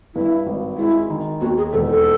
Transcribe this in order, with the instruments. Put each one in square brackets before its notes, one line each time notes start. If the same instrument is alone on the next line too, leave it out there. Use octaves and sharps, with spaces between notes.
[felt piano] G2 [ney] E4
[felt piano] G#1
[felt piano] G#3 [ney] E4
[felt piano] D#3
[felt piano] D#2 [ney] F#4
[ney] G#4
[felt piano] E1 [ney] A4
[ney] A4